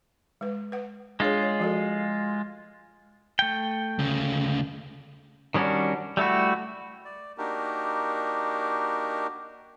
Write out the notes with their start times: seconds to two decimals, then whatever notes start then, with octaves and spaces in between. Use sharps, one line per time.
0.41 G#3 B4
0.72 B4 F#5
1.20 G#3 D4 F4 G#4 C#5
1.43 C#5
1.60 F3 F#4 A4
3.39 A3 G5
3.99 D2 C#3
5.54 D#3 G3 C#4 D4 F#4
6.17 G3 A3 E4 F#4
7.05 D5
7.38 A#3 D4 D#4 F#4 G4 A#4